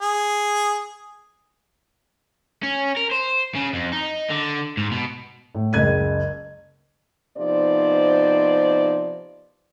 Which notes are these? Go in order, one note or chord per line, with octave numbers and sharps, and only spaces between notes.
G#4
C#4
A#4
C5
C#3
F2
D#4
D3
G#2
B2
A2
F#1 C#2 G#6 D#7
C3 F3 B3 D#4 C5 D5